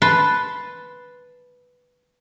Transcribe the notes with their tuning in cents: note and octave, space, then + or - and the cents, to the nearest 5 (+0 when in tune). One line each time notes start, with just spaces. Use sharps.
B4 +0 A5 +0 C6 +0